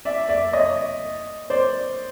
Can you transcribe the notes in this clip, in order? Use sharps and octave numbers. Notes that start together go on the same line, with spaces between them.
D5 E5
D5 E5
C#5 D#5
C5 D5